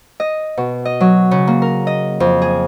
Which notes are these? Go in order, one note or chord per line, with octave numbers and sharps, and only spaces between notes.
D#5
B2
D#5
F#3
C#3
A#3
A#4
D#5
F2
G#4